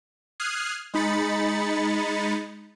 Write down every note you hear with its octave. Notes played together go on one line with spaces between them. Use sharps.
D#6 F6 F#6 G#6 C7
G#3 D#4 B5 A6 C#7